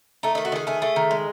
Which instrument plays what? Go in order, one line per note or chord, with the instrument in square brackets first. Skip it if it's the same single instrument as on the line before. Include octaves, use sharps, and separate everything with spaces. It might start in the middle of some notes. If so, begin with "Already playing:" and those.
[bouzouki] A3 D#4
D#3 D#4
F#4
D#3 G#4
A3 G#4
A3
D#3
G#3